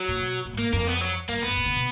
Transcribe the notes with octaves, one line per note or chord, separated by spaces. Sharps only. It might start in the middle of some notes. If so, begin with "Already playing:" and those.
Already playing: F#3
A#2
B2
A#2
G#2
A#3
F2 A#3
B3
F#3
F#2 A#3
F2
F#2 B3
A#2
D3
B2